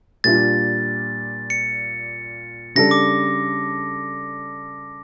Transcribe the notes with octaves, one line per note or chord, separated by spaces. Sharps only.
A#2 G3 D4 F4 A6
C#7
C#3 G3 D4 A4 A#6
D6